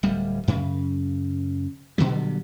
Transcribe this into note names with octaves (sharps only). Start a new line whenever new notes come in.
D1 G3
F#2 C#3
A#2 D3 F#3 G3